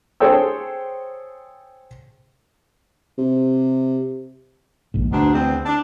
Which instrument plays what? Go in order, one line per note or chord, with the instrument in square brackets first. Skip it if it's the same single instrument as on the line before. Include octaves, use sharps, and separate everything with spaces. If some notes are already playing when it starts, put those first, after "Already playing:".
[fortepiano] G#4 A4 C5 C#5 G5 E6
[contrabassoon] C3
[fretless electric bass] A#1 G#2
[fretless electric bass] D2 A3 [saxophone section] G#2 B2 D4
[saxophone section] E2 C4
D4